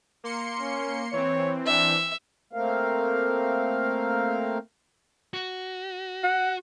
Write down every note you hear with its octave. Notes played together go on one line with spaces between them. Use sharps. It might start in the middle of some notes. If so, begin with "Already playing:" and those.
A#3 C6 C#7
C#4
E3 C4 C#5
D4 E5
A3 A#3 C4 A#4 F5
F#4
F#5